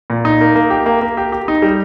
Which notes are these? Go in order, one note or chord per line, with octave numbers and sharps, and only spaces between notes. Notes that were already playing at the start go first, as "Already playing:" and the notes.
A#2
D#4
A#3
A#3
G4
A#3
A#3
G4
G4
D#4
G3